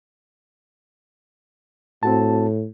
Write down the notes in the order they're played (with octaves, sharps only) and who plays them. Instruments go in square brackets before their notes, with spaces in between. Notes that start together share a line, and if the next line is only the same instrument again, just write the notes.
[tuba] A2 [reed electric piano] C4 F#4 A5